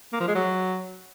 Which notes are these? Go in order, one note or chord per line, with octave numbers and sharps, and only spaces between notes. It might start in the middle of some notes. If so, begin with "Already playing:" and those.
A#3
F3
G#3
F#3